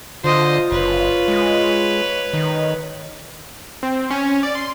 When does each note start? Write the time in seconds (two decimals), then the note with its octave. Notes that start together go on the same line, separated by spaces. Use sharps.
0.24 D3 F4 C5 D#5
0.72 F#1 B4 C#5
1.28 G#3
2.33 D#3
3.83 C4
4.11 C#4
4.43 D5
4.55 C6